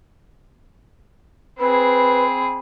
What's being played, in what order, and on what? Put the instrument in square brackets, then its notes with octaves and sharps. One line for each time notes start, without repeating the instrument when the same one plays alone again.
[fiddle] C4 G#4 [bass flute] B4 [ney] B5